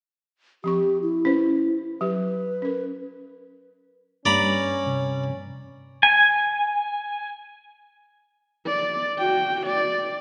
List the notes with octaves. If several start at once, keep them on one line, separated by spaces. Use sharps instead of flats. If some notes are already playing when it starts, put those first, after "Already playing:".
F3 C4 G4 C#6
E4
C#4 B4 C5
F#3 G4 B4
C#4 A#4
G2 C#4 D5 A#5 B5
C3
G#5
D5
F#4 G5
D5